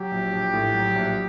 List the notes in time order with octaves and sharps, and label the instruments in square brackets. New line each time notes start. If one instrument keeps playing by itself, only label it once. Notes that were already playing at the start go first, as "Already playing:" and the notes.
Already playing: [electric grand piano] F#3 [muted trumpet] G4
[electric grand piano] A#1
A#1
A2
F#3
A#1